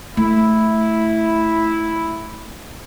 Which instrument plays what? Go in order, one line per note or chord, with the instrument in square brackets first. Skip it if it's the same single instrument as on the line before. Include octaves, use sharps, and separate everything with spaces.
[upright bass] A3 [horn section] E4